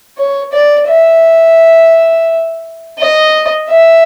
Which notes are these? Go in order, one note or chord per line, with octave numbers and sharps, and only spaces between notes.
C#5
D5
E5
D#5
E5